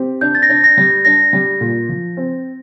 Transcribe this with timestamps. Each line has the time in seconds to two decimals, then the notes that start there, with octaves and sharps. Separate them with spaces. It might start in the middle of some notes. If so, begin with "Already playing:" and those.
Already playing: C4 G4
0.21 D4 G6
0.35 A6
0.42 A#6
0.49 D4
0.64 A#6
0.77 G3
1.05 D4 A#6
1.33 G3
1.61 A#2
1.89 F3
2.17 C4